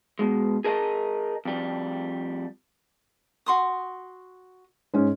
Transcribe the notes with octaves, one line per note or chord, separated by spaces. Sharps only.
B2 G#3
G#4 A#4 D#5 A5
F2 G3
F#4 C6 D#6
G#2 C#4